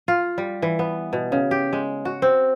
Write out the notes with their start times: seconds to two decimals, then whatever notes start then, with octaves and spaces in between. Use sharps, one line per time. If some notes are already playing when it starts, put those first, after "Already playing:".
0.08 F4
0.38 G3
0.62 E3
0.79 B3
1.13 B2
1.32 C#3
1.51 G4
1.73 G#3
2.05 F#4
2.22 C4